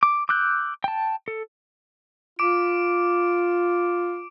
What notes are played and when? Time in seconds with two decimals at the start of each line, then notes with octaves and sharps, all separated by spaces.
0.03 D6
0.29 D6 E6 F#6 G6
0.84 G5 A5
1.28 A4
2.39 F4 D6 D7